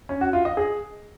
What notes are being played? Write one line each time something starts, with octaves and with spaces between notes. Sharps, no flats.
C#4
F#4
F4
D#5
G#4